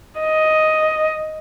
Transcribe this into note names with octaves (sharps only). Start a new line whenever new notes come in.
D#5